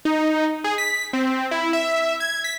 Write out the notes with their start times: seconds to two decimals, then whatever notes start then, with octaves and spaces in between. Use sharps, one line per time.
0.05 D#4
0.64 G#4
0.78 B6
1.13 C4
1.51 E4
1.73 E5
2.20 G#6
2.44 B6